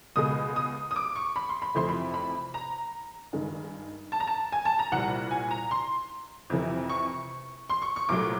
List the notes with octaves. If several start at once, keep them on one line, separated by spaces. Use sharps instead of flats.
C#2 B2 G#3 D#6
D#6
D#6
D6
C#6
B5
C6
B5
F2 C3 E3 A3 C6
B5
B5
A#5
G2 D#3 G#3
A5
A#5
A5
G#5
A5
A#5
C2 A#2 G3 F#5
G#5
A#5
C6
F2 C3 E3
C#6
C6
C#6
C#6
C2 A#2 F#3 A3 D6